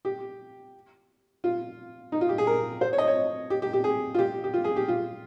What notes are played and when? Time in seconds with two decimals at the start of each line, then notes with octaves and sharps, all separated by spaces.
0.05 G4
1.44 F4
2.12 D#4
2.21 F4
2.29 G4
2.38 G#4
2.47 A#4
2.81 C5
2.93 C#5
2.98 D#5
3.07 C#5
3.50 G4
3.62 G4
3.73 G4
3.84 G#4
4.14 F4
4.19 G4
4.44 G4
4.54 F4
4.64 G#4
4.76 G4
4.88 F4